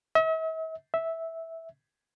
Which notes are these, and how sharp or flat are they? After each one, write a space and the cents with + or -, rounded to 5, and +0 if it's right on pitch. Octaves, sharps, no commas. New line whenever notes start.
E5 -45
E5 -10